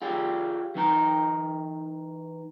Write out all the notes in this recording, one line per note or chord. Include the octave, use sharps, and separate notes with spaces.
F4 G4 G#4 D5
E3 D#4 A#5